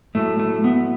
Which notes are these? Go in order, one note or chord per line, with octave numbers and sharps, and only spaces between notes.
A2 F#3 A3
A3
B3